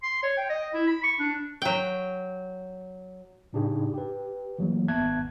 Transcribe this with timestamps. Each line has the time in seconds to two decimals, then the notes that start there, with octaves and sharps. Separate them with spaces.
0.03 C6
0.23 C#5
0.37 G5
0.50 D#5
0.73 E4
0.87 B5
1.03 C#6
1.19 D4
1.62 F#3 G5
3.53 A2 C#3 D4 D#4 G4 G#4
3.94 G4 B4
4.59 E3 F#3 A3 A#3
4.88 G#1 B3 E5 A5 F#6 G#6